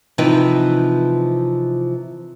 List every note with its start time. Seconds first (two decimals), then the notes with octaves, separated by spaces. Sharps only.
0.18 C3 E3 F3 D#4 B4 G5